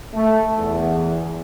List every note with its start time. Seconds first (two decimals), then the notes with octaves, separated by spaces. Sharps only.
0.15 A3
0.57 E2